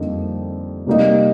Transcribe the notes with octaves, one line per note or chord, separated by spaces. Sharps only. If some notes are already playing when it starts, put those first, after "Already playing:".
Already playing: F2 D3 G3 A#3 D#4
C3 G3 A#3 D#4